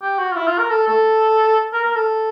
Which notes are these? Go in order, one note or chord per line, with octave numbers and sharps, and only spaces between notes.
G4
F#4
F4
E4
F4
A#4
A4
A4
A#4
A#4
A4